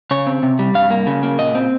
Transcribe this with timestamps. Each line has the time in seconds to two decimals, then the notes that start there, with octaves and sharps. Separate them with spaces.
0.11 C#3 C#5
0.27 C4
0.43 C3
0.59 G3
0.75 G2 F5
0.91 A#3
1.07 C#3
1.23 A#3
1.39 A#2 D#5
1.55 C4